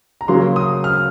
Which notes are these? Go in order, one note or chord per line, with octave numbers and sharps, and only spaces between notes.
A#5
C#3 F#3 A#3 C6
D#6
F6